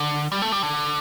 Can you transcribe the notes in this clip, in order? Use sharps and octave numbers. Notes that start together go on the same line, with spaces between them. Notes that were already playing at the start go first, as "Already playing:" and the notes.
Already playing: D3
G3
A3
G3
D3